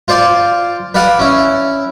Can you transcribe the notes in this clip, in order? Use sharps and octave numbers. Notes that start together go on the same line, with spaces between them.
F4 C5 D5 G#5
B4 D5 F5 F#5 G#5
C#4 E4